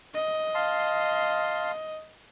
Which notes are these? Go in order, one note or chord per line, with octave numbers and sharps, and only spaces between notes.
D#5
F5 A5 C6